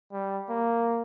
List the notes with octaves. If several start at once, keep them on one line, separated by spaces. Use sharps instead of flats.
G3
A#3